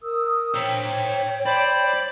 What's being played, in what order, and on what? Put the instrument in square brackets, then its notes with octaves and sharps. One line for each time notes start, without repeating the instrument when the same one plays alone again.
[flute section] A#4 D#6 E6
[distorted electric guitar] C5 A#5 [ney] C#5 [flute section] G5
[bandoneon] C5 B5 [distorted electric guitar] D5